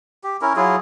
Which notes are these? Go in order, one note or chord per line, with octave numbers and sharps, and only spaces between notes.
G4
C#4 E4 A#4
F#3 E4 F4 G#4